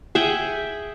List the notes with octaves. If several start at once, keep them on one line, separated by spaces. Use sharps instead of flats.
G#4 E5 F#5 G5